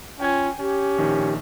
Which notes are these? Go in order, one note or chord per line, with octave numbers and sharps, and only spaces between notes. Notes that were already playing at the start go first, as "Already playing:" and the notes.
C#4 F4 G5 G#5 G#6
C#4 G4
A#1 D#3